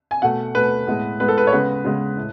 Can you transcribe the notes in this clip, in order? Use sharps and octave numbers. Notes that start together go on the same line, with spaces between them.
G#5
B2 A3 F#5
B2 A3 B4
A2 G#3 B3
A2 G#3 B3 B4
A4
B4
C#5
C#3 G#3 B3 B4
C#3 G#3 B3
A2